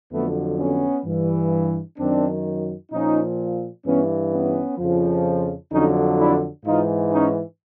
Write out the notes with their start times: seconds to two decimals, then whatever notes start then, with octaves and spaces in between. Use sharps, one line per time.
0.12 F2 D3 F#3 A3 B3
0.58 B3 C#4
1.05 G2 E3
1.98 F#2 D#3 F#3 C4 D4
2.92 A#2 F3 C#4 D#4
3.86 G2 E3 B3 C#4
4.32 B3 C#4
4.78 F2 C#3 F3
5.72 F2 D3 F#3 C#4 D#4
6.19 D4 E4
6.65 G#2 E3 D#4 F4
7.13 C#4 D#4